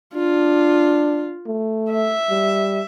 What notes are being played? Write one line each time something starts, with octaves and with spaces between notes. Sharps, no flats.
D4 F4
A3
E5
G3